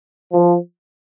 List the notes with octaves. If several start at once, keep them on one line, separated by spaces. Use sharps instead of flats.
F3